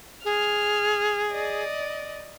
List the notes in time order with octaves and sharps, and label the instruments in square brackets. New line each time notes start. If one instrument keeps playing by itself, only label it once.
[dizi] G#4 [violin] F6
[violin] D5 D#5